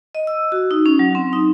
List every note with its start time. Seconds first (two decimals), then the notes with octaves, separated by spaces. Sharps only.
0.15 D#5
0.27 E6
0.52 F#4
0.71 D#4
0.86 C#4
0.99 F#3
1.15 C4
1.33 D#4